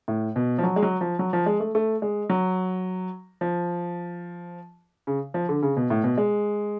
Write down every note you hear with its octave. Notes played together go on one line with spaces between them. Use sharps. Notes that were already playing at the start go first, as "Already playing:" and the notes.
A2
B2
F3
F#3
G#3
F#3
F3
F#3
F3
G#3
A3
A3
G#3
F#3
F3
C#3
F3
D3
C#3
B2
A2
B2
G#3